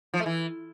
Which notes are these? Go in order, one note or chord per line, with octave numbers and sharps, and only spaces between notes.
F3
A3
E3